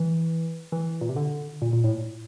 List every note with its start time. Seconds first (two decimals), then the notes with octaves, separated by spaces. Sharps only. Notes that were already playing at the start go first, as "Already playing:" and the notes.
Already playing: E3
0.72 E3
1.01 A#2
1.09 C3
1.16 D3
1.62 A#2
1.73 A#2
1.84 A2